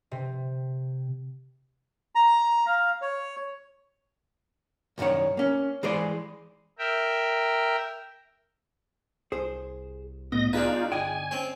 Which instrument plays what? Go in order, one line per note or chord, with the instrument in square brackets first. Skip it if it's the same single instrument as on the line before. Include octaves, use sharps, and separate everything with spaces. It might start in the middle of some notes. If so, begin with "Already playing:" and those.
[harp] C3
[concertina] A#5
F5
C#5
[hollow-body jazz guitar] C2 F#2 C3 D#3 C#5
A#3 C#4
E3 G#3 G#4 C5 D5
[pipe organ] A#4 E5 G5
[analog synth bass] C2 [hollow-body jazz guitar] G#4 C5
[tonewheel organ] A2 D#5 A#6 [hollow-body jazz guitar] B3
[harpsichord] D4 G#4 B4 [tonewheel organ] D#4 F4
[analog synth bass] G1 [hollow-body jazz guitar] D5 D#5 G5 [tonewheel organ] G#5
[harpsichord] C4 C#4 C#5